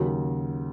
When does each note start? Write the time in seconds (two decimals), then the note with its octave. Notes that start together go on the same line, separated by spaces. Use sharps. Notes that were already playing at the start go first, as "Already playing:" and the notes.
Already playing: D#2 C#3 F#3